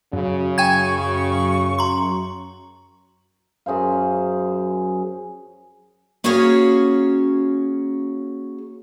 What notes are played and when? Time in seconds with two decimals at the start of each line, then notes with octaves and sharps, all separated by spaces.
0.13 F#2 C#3
0.58 F#2 G5 G#5 C#6 G#6
1.79 A#5 C6
3.66 F#2 G#4 C5 F5
6.24 A#3 C#4 F#4 G#4 C#5 F5